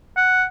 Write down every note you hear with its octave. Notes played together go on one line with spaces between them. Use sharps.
F#5